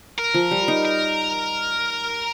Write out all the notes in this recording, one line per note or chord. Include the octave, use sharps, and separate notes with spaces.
A#4
F3
G3
D#4
A#4